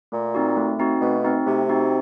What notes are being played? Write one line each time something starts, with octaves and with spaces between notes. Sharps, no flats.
A#2 A3
C4 D#4 F#4
A3
C4 D#4 F#4
B2 A3
C4 D#4 F#4
C3 A3
C4 D#4 F#4